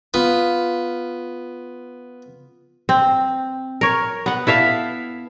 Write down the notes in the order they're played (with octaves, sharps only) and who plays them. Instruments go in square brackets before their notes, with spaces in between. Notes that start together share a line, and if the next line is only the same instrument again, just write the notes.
[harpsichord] B3 [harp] F4
[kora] C4
A#4 C#5
B3 F#5
E4 A4 E5 F5